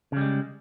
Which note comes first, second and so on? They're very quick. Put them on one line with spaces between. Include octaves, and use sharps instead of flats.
C#3 G3 G#3